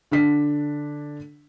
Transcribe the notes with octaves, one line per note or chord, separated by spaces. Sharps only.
D3 D4 B6